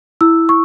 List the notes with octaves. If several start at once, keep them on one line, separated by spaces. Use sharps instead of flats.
E4 E6
C#6